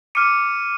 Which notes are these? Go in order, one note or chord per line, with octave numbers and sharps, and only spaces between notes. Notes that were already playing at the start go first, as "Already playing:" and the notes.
D6 F6 C#7 D#7